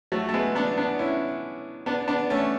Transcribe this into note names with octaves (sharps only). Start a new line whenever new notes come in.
F#3 A3
A3
G#3 B3
B3 D4
B3 D4
C#4 E4
B3 D4
B3 D4
A3 C#4